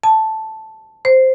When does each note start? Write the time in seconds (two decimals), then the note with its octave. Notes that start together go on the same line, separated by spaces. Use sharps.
0.04 A5
1.05 C5